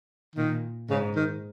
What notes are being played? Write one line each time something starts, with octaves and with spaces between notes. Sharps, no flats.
A#2 D#3
G#2 C#3
D#3